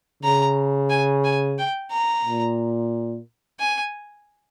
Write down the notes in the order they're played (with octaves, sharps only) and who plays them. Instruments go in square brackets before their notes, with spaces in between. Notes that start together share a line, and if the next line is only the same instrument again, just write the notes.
[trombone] C#3 [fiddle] A#5
[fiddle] G#5
G#5
G5
A#5
[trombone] A#2
[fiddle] G#5